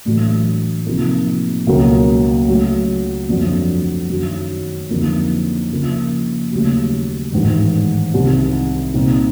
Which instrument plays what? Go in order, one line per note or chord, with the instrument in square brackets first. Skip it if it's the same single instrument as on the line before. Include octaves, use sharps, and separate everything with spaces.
[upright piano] A1 A2 F#3 A3 D4
C3 F3 A#3 D#4
C#2 B2 F#3 A#3 C#4
C#3 F#3 A3
G1 F2 D3 F#3
F#2 D#3 F#3
F2 D3 F#3 A#3 D#4
C#3 F3 A#3
D#2 C#3 F#3 A3 C#4
A1 G#2 D#3
C2 C3 D#3
C2 A#2 G3 C4 D#4